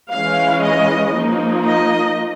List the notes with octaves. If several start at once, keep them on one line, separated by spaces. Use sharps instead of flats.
E3 G#3 C#4 F5
D#5
F3 A#3 D#4
D#5